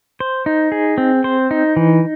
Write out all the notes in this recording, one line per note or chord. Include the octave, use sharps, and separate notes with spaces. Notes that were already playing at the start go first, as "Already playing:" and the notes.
C5
D#4
G#4
C4
C5
D#4
E3